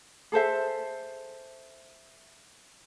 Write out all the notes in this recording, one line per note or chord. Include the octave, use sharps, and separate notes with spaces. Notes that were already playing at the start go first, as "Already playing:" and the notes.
G#4 A4 C5 E5